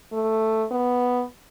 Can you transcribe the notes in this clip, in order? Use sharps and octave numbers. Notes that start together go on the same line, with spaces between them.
A3
B3